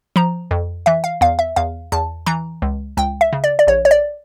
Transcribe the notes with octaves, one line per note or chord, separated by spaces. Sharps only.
F3 A#5
F2
E3 E5
F5
E2 F5
E5
E2 F5
E2 A5
E3 A#5
C#2
C#2 G5
E5
C#3
D5
D5
A#1 C#5
C#5
D5